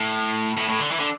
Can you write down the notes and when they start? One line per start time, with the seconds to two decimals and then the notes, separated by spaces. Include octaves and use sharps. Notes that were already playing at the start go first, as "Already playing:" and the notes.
Already playing: A2
0.57 A2
0.68 A2
0.80 D3
0.91 E3
0.99 D3